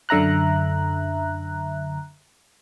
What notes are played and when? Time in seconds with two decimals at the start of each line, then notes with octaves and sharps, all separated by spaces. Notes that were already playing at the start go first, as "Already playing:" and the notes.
0.09 F#2 D3 E5 A#5 F#6